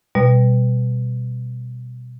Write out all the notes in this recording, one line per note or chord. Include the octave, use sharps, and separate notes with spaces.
B2 G3